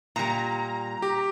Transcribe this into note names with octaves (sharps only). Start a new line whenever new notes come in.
A#2 G3 A#5
G4